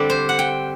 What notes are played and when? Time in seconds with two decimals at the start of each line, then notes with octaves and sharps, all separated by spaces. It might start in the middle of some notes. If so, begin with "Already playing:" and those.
Already playing: D3 G3 C4 D5
0.10 C5
0.29 F#5
0.39 G5